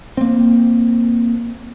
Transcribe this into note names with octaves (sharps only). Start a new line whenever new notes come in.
A#3 C4